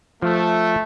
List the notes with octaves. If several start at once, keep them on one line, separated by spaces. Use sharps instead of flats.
F3 A3